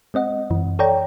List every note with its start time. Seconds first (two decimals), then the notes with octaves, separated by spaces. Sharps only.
0.14 G#3 C4 D#5 F#5
0.50 F#2 E3
0.79 A4 C#5 D5 G5 A#5